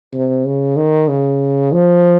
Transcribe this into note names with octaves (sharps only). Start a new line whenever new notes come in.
C3
C#3
D#3
C#3
F3